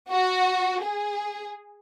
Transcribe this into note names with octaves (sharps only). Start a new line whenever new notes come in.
F#4
G#4